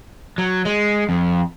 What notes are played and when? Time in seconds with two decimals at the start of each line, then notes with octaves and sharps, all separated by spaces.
0.38 F#3
0.65 G#3
1.09 F2